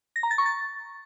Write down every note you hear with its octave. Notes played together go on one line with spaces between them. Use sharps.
A#6
A#5
A6
C#6
A6